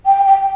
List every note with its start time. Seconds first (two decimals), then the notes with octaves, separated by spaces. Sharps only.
0.06 G5
0.26 G5